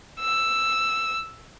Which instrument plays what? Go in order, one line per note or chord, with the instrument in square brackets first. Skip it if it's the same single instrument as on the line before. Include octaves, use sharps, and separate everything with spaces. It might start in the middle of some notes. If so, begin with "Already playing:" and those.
[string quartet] E6